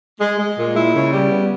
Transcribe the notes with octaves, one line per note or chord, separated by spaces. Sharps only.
G#3
G#3
A#2
E4
C#3
G3
B3